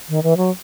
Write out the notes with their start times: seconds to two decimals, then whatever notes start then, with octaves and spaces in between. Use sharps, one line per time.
0.09 D#3
0.23 E3
0.37 F#3